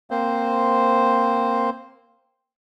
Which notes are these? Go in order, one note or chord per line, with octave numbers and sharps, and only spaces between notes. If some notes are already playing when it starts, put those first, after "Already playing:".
A#3 C4 C5